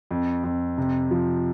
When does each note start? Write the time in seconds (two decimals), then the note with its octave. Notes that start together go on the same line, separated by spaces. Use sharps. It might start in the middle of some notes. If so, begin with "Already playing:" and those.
0.11 F2
0.44 F2
0.78 C3
1.11 F3